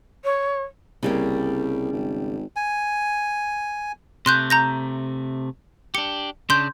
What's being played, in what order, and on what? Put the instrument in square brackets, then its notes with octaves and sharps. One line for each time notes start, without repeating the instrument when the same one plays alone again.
[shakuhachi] C#5
[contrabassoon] C2 [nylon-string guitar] C#3 G3 A#3
[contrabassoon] G#1
[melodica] G#5
[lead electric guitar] C3 A3 [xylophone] C6 F#6 G6
[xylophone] A#5 G6 A#6
[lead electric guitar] D4 G4 [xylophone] C#7
[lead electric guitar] C#3 D4 [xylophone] C6 G6